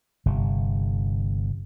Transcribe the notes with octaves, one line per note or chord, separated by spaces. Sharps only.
G1 C3